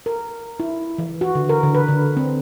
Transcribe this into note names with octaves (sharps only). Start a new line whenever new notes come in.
A#4
E4
E3
F#4
D3
A#4
D3
B4
D3
C4